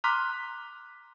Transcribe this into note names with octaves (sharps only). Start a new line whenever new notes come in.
A#5 C6 D6 F6 F#6 B6